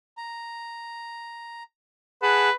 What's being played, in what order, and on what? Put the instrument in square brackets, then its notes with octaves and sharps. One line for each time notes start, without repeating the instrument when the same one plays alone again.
[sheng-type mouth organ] A#5
[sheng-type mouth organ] G#4 F#5 A5 [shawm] B4